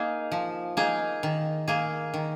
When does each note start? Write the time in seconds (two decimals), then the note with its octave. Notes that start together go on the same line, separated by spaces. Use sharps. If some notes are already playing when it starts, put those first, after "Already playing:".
Already playing: A#3 D#4 G#4
0.32 F3
0.77 A#3 D#4 G#4
1.23 D#3
1.68 A#3 G#4
2.14 D#3